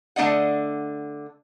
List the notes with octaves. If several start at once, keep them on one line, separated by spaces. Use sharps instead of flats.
D3 A3 D4 D#5 F#5